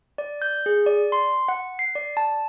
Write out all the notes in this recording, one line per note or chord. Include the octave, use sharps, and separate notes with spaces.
D5
G6
G#4
D5
C6
F#5
C7
D5
A5